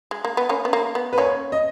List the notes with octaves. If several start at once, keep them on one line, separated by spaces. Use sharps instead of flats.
G#3
A#3
B3
A#3 C#4
B3
A#3
B3
B4
A#3 C#4 C#5
D#5